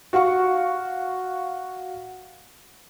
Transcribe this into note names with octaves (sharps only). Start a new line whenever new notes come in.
F#4 F5 F#5 C#6